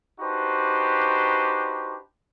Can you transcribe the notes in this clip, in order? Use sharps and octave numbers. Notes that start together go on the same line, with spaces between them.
D4 D#4 F#4 G4 B4 C5